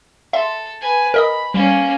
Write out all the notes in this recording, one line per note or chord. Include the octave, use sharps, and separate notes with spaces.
A4 E5 C6
B4 G#5
A#4 D#5 B5 D#6
G3 A#3 C#4